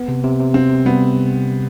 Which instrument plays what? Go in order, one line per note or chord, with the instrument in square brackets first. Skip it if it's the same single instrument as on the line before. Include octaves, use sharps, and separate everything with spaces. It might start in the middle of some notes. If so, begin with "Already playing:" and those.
Already playing: [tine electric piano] B3
C3
C3
C3
[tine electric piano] C3 [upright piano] C4
[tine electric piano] C3
[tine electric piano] G3 [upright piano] B3